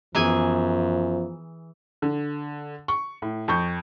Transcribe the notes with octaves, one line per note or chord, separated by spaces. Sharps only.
F#2 E3 F3 B3 F#4 G#4 G#5 A#5
D3
C#6
A2
F2 C#6 G6